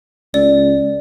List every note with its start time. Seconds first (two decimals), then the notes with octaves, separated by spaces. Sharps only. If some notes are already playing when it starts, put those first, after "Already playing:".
0.34 C#2 D5